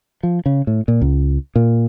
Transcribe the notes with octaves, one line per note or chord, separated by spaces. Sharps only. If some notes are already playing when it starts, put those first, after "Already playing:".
F3
C#3
A2
A#2
C#2
A#2